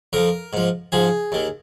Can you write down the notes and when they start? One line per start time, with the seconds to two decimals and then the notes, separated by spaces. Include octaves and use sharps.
0.13 F2 F3 A#4
0.53 G#2 F3
0.92 G#2 F3 G#4
1.32 D#2 D#3